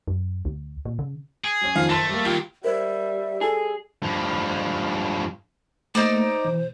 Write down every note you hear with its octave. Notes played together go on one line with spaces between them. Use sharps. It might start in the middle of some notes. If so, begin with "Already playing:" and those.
F#2
D2
A#2
C#3
G#4
F#3 C#4
F2 D#3 F3 F5
F#1 A3 A5 C6 A6 A#6
G3 A#3
D#3 F#3 F4 G4
G3 A#4 C5 E5
G#4 A4
G2 F3
A3 A#3 D#4 C5 D5
B2 E3